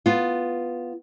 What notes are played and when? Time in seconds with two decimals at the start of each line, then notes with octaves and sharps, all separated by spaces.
0.06 B3 F4